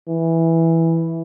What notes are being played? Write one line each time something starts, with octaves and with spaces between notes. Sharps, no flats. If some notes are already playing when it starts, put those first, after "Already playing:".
E3